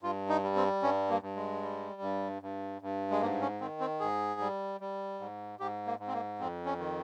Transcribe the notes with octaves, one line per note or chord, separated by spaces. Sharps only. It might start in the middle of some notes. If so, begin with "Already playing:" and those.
G2 F4
D#4
G3
C4
G2 C#4
A#3
G2
G#3
G3
G2
G2
G2
G#3
G#2 A#3
C#4
D#3 C4
C4
G#2 G#4
G3
G3
G#2
G#2 G4
A#3
G#2
C4
A#3
F2 C4
C#4
D#3